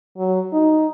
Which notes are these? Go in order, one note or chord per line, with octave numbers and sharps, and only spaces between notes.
F#3
D#4